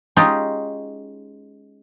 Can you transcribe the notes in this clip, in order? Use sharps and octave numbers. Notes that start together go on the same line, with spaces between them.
G#3 C#4 D#4 F4 G4